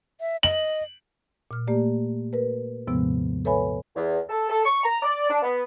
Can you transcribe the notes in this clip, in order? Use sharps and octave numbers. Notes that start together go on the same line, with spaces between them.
E5
D#5 F#7
A#2 F6
A3 A#3 G4 D5
A#4 B4
D#2 G#2 C3 F3 G#3 B3
A4 B4 C#5 E5 G#5 B5
E2
A4
A4
C#6
A#5
D5
D4
B3